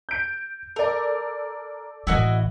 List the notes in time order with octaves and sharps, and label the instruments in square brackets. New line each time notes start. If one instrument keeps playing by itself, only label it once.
[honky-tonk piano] G6 D7
[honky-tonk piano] A4 D5 [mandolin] A#4
[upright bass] A1 E3 [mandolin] E4 F#4 D#5